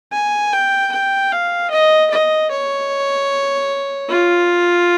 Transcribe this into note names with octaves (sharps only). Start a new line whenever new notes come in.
G#5
G5
G5
F5
D#5
D#5
C#5
F4